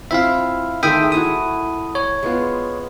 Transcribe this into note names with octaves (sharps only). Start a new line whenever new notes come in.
C4 E4 F4 E5 F5
D#3 G#3 A3 E5 G5 D#6
A3 E4 F#4 D#6
C#5
G#3 B3 F4